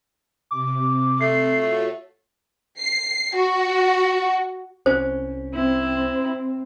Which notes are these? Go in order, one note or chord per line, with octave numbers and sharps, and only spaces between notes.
C3 D6
A3 C7
F4 F#4 C#5
C7
F#4
C2 C#4 C5
C4 E4